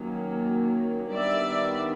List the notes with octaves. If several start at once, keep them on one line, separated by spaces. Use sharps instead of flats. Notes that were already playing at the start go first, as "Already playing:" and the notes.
Already playing: D#3 F#3 A#3 C#4
D#3 G3 B3 D4 D5 E5